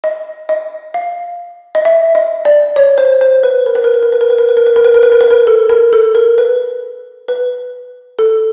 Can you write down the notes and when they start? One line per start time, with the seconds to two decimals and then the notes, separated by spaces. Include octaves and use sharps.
0.04 D#5
0.49 D#5
0.94 F5
1.75 D#5
1.85 E5
2.15 D#5
2.45 D5
2.76 C#5
2.98 C5
3.21 C5
3.43 B4
3.66 A#4
3.75 B4
3.84 A#4
3.94 B4
4.03 A#4
4.12 B4
4.21 A#4
4.30 B4
4.38 A#4
4.49 B4
4.57 A#4
4.66 B4
4.76 A#4
4.84 B4
4.94 A#4
5.03 B4
5.12 A#4
5.21 B4
5.30 A#4
5.47 A4
5.69 A#4
5.93 A4
6.15 A#4
6.38 B4
7.28 B4
8.19 A4